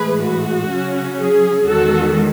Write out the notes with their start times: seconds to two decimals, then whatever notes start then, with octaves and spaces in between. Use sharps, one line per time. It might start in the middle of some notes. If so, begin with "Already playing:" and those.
Already playing: A2 E3 G#3 G#4 B4
0.24 F#4
0.71 C#3 F#3 C#4
1.19 G#4
1.66 E2 D#3 G#3 C#4 F#4 A4